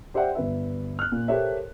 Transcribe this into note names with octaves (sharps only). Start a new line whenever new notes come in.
G4 C5 D5 E5 F#5 G5
G1 B4 E5
F6 F#6
A#2
G4 A4 A#4 C5 C#5 E5